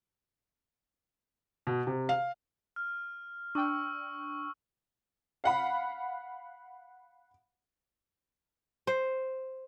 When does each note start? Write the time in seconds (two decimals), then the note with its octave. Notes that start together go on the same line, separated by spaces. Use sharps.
1.67 B2
1.87 C3
2.09 F5
2.76 F6
3.55 D4 G5 C#6 E6
5.44 F5 F#5 B5
8.87 C5